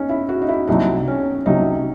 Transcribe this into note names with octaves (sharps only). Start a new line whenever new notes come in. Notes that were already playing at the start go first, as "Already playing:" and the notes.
Already playing: C#4 D#4
E4
F#4
D#4
E4
C2 C3 F#3 D#4
C#4
C2 C3 F#3 D#4